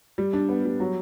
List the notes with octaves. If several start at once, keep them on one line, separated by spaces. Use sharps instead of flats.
G3
D4
B3
G3
F#3